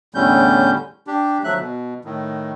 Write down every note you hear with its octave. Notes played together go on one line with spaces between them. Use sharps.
E2 A2 D3 G3 C#4 G6
D4 G4
D2 F3 F#3 A3 E5 F#6
B2
A2 D#3